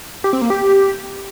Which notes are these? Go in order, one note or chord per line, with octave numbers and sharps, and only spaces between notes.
G4
C4
A#3
G4